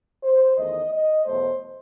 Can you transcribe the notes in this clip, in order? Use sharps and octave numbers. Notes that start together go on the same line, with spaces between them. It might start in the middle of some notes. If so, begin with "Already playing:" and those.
C5
E2 D#3 A3 D#5
D#5
E2 B2 F#3 A3 C5